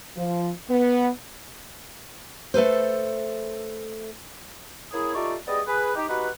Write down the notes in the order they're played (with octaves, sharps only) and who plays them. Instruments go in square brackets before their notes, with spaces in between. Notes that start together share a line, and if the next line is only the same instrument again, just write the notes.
[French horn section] F3
B3
[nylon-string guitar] A3 A4 B4 C5
[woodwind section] A#3 C#4 E4 G#4
A3 D#4 F4 G4 D5 C#6
G3 B3 G#4 D5 D#5
G#4 B4
D#4 G4
B3 D#4 F#4 G4 B4